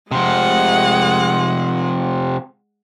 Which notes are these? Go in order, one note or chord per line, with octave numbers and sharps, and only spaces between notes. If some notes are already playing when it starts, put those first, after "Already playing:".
C3 F3 G#3 F#5